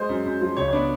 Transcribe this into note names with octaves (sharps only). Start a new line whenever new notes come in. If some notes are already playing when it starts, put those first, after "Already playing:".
Already playing: G#3 C5
F#2
F#2
F3
C#2 C#5
C#5
B3 D4 D5